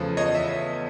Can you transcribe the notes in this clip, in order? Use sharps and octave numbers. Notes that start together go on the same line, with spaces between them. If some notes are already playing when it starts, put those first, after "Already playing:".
Already playing: E2 C#3 F3 A3 B4
E2 C#5 D#5
E5